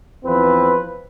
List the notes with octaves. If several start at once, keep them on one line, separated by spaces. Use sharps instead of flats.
E2 F3 C4 B4